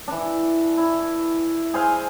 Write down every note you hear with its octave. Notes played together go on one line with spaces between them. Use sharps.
E3 D4
E4
G#4 C5 F5 G#5